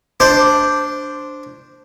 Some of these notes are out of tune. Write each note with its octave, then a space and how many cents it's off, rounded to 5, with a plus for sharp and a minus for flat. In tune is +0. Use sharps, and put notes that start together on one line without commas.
D4 +0 C5 +0